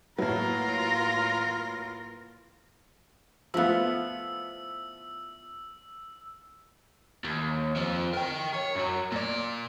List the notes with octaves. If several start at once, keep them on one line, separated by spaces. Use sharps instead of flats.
A2 F#3 A#3 E4 F4 A#4 B4 A#5
F3 A3 B3 E4 F4 E6
D#2
F3 C4
A#4 G5
C#5
F#2 F#3
A#2 D5